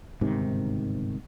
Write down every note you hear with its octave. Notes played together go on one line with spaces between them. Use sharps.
G1 G#2 C3 D#3